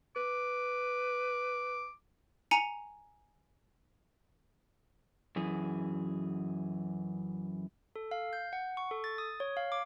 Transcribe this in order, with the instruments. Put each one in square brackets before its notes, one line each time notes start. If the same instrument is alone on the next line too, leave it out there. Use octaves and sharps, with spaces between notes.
[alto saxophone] B4 [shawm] D6
[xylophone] G#5 A#5 C#7 D#7 F7
[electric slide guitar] F#2 E3 G#4
[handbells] A4
F5
G6
F#5
C#6
A4
A6
D#6
C#5
F5
D6